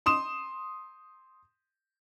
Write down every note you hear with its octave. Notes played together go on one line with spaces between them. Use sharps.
C6 D#6 E7